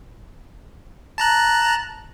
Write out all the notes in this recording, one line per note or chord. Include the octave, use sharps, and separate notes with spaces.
A5 A#5 F#6